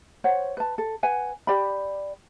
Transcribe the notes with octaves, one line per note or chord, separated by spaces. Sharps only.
C5 C#5 F#5
B4 A5
A4
B4 F#5 G#5
G4 D5 G5 B5